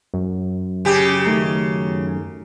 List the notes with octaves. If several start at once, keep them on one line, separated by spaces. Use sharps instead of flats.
F#2
C#3 G4
D#3 A3 A#5